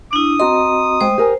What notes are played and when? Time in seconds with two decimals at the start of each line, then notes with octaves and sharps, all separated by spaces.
0.13 D4 E4 D#6
0.40 C4 F#4 D#5 A#5 C6
1.01 G#3 C5 G5
1.18 G4 A#4 G#5